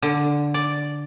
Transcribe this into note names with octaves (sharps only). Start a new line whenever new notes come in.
D3
D5